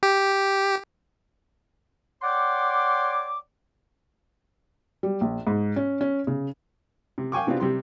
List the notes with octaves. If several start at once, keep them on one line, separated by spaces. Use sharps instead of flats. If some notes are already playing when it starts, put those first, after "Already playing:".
G4
C#5 D5 F#5 G5 C6 D6
G3
A#1
G#2
C#4
C#4
C#3
C3
F5 G5 G#5 C#6 D6
C3 B3 C4 D4 F4 F#4
C3 G3 C6